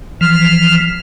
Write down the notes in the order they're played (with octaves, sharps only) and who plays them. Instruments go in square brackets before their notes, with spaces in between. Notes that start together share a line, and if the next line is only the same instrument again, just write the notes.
[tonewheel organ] E3 F3 [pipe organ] F6